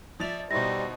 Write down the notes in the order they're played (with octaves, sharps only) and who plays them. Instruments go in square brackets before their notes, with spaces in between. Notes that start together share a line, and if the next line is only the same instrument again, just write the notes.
[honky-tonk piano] F3 A6 F7 [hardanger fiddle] D5 E5
[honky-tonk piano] B2 E4 [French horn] G3 [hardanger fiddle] D#4 C5 [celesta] A#6